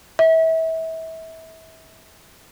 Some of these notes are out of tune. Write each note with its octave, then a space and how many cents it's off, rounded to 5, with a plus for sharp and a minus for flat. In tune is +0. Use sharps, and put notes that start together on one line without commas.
E5 -30